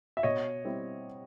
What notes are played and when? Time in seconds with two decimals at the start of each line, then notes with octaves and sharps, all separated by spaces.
0.17 E5
0.23 B2 C#5 D#5
0.65 G3 C4 E4